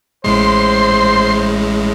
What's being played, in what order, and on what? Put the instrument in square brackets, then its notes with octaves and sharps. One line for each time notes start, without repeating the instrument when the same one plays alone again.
[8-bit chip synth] A1 A2 G#3 [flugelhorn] C5 [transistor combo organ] C6